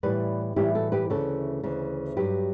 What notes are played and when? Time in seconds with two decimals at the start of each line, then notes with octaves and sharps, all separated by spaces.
0.03 A2 E3 G3 B4 D5
0.56 A2 E3 G3 E4 G4
0.75 F#4 A4
0.92 G4 B4
1.10 D2 C#3 E3 A4 C#5
1.63 D2 C#3 E3
2.17 G2 F#3 G4 B4